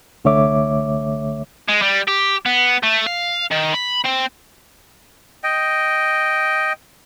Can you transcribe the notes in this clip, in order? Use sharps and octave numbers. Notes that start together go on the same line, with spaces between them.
C2 D3 A3 C#5 E5 D6
G#3
G3
G4
B3
A3
F5
D#3
B5
C4
D#5 G5